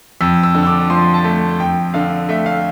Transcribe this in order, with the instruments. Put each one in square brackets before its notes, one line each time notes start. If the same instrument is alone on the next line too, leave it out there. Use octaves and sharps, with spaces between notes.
[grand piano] F2 E6
E6
D3
E6
D6
F3 C6
A5
A3
F2 G5
D3 F5
A3 E5
F5